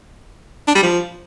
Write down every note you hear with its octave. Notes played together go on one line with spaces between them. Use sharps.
D4
G3
F3